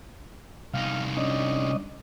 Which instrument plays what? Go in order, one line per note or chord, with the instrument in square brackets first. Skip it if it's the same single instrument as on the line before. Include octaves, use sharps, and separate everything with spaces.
[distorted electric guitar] C2 D#4 [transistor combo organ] F5
[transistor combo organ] C#4 D4 D#5